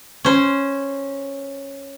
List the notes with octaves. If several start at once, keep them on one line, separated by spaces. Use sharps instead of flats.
C#4 C5